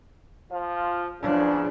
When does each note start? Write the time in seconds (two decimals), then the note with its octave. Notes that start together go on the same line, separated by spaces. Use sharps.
0.52 F3 F4
1.23 E2 C#3 F3 D4